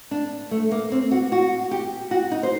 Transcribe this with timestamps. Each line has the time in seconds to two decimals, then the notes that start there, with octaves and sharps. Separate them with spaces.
0.11 D4
0.51 A3
0.71 A#3
0.92 C4
1.11 F#4
1.32 F#4
1.71 G4
2.11 F#4
2.32 D#4
2.43 C5